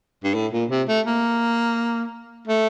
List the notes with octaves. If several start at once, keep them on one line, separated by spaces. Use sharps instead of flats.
G2
A2
A#2
C3
A3
A#3
A3